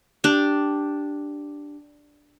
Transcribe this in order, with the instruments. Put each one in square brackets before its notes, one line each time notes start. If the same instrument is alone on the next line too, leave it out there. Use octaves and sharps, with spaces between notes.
[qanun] D4 G4